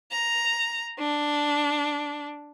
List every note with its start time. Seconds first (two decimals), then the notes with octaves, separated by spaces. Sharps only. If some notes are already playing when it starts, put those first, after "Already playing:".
0.13 A#5
0.99 D4